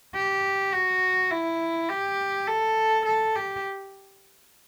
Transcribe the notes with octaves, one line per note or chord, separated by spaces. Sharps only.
G4
F#4
E4
G4
A4
A4
G4